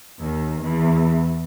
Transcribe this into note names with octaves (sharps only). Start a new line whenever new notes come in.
D#2 D#3
E2 E3